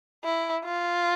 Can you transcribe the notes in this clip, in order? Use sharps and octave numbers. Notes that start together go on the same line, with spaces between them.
E4
F4